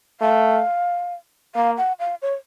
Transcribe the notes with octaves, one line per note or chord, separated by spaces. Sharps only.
A3 F5
A#3 F5
F#5
F5
C#5